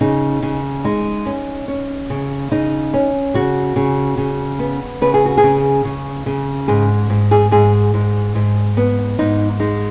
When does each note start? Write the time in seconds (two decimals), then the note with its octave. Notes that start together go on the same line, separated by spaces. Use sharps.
0.01 C#3 D#4
0.42 C#3
0.85 G#3 D#4
1.26 C#4
1.68 C#4
2.10 C#3
2.51 C#3 D#4
2.94 C#4
3.34 C#3 F#4
3.76 C#3
4.17 C#3
4.59 B3
5.01 C#3 B4
5.14 G#4
5.25 F#4
5.37 G#4
5.43 C#3
5.85 C#3
6.26 C#3
6.68 G#2 G#4
7.10 G#2
7.31 G#4
7.51 G#2 G#4
7.94 G#2
8.35 G#2
8.77 B3
9.19 G#2 D#4
9.60 G#3 D#4